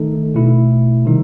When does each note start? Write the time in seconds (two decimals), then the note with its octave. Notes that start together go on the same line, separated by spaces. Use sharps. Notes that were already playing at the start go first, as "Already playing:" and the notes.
Already playing: D#3 A3 D#4 A4
0.34 B2 A3 E4
1.05 C3 D#3 G3 D#4